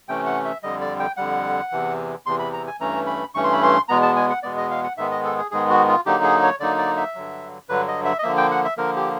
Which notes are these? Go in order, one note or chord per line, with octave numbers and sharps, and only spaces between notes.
C3 E3 A3 C#4 G5
F#5
E5
F2 D3 G3 D#5
D5
G5
F2 D3 G3 F#5
E2 C3 E3
E2 C3 E3 C6
B5
A#5
G#5
G2 E3 A3 C#4 A#5
B5
G2 E3 A3 C#4 C#6
C6
B5
C6
E2 B2 G#3 B3 A#5
A5
G#5
F#5
E2 B2 G#3 B3 D5
D#5
F5
F#5
G#2 D#3 G#3 B3 E5
D#5
A4
G#4
G#2 D#3 G#3 B3 G#4
F#4
F4
D3 F#3 A#3 D#4 G4
G#4
C#5
D3 F#3 A#3 D#4 D5
D5
E5
G2 D3 F#3
G2 D3 F#3 B4
D#5
E5
D#5
D3 F3 A#3 E5
G5
F#5
E5
D3 F3 A#3 A#4
G4